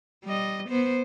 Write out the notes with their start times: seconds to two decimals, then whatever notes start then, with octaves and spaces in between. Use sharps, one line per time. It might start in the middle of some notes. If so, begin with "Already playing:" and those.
0.24 G3 D#5
0.69 B3 C5